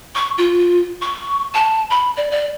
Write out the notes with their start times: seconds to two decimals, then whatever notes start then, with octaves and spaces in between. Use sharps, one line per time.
0.15 C#6
0.38 F4
1.01 C#6
1.54 A5
1.90 B5
2.17 D5
2.31 D5